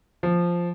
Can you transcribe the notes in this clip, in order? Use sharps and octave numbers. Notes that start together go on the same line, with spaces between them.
F3